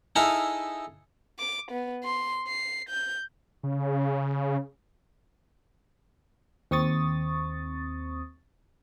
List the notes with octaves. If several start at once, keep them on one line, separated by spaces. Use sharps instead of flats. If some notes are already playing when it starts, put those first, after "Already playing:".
D#4 E4 G#4 A4 F5
D6
B3
C6
C7
G6
C#3
D#2 C4 C#6 D#6 A6